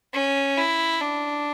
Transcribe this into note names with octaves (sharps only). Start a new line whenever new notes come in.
C#4
E4
D4